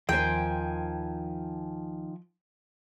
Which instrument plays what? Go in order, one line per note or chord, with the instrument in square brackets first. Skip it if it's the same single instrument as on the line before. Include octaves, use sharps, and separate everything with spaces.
[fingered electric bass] D#2 C4 [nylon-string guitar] D#3 C5 [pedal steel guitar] F3 G#5 [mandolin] G5